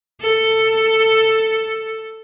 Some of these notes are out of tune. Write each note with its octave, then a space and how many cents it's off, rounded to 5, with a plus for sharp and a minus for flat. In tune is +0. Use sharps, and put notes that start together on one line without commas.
A4 +10